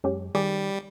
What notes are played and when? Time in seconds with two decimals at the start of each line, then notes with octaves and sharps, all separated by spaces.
0.04 F#2 G#3 C#4 G4
0.35 D#3 G3 G#4 D5